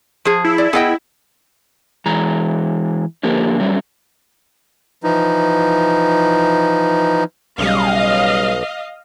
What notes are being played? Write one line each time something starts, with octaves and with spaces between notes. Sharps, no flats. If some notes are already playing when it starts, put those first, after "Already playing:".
F3 G#4
E4
D5
B3 G#4 D#5 G5
E3 G#3 A#5
D3 F3 A#3 G4 A#4
F#3 G3 A3 C#4
E3 F3 D#4
B1 C#3 G3 D#5 F5